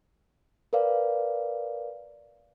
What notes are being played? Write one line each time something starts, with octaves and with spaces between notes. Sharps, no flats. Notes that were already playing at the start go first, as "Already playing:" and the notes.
A#4 B4 D5 F5